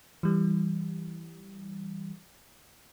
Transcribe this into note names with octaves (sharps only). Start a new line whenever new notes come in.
E3 G3